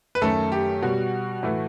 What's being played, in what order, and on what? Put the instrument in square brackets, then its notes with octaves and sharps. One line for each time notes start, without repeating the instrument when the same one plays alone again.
[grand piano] B4
F#2 D#3 A3 A4
G4
B2 G3 F#4
A2 E3 A3